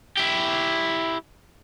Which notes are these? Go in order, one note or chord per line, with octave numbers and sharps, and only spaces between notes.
E4 G4